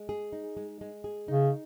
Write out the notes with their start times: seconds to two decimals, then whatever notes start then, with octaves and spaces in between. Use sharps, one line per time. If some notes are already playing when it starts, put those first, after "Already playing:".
Already playing: G#3
0.09 G#4
0.33 D#4
0.57 G#3
0.81 G#3
1.04 G#4
1.28 C#3 D#4